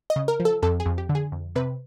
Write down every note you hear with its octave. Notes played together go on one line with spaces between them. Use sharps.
D#5
C#3
A#4
F3
A4
F2 A4
G#4
F2
G4
D3
G#4
F2
C3 B4